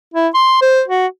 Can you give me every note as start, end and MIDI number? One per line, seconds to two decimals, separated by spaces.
0.14 0.28 64
0.34 0.61 84
0.62 0.83 72
0.88 1.07 66